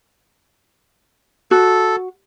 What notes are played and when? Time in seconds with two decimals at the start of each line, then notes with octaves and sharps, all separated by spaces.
1.51 F#4 A4